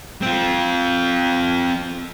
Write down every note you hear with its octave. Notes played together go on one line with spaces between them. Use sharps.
C4 F4